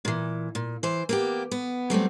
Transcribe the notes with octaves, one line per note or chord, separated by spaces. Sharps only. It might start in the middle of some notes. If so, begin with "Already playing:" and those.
A#2 E3
A#2
E3 C5
A#3 B3 G4
B3
F#3 G3 A3 C4